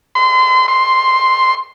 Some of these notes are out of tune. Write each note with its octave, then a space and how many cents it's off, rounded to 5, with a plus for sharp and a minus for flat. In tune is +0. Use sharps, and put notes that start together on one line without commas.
C6 -35
C6 +0